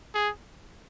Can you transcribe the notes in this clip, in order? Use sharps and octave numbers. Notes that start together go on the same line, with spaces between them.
G#4